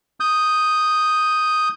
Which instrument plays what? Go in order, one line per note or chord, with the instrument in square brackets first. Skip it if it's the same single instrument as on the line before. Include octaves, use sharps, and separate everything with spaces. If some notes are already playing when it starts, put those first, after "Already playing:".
[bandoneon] D#6 G6